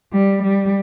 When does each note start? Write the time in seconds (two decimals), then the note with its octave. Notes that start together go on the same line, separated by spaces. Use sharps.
0.13 G3
0.43 G3